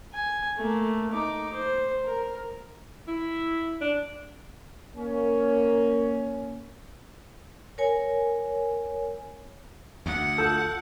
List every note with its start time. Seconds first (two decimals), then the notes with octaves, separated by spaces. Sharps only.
0.13 G#5
0.57 A3 A#3
1.11 D#4 D6
1.53 C5
2.05 A#4
3.07 E4
3.81 D4
4.97 A#3 C#4
7.78 A#4 C#5 G#5
10.06 D2 F#5
10.38 F4 A4 E6 G6